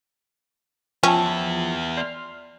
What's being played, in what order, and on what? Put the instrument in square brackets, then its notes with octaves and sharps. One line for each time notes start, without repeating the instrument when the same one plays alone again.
[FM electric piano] F3 [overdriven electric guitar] B3 E5 [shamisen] C#4 [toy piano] G5 A5
[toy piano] D5 [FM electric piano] C6 F6